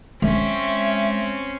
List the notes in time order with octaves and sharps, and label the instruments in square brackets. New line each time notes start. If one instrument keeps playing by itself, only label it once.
[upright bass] G#3 [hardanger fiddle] C4 C#4 [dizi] E5